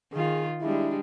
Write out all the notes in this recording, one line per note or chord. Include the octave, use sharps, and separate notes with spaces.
D#3 F4 G#4
G3 G#3 D4 E4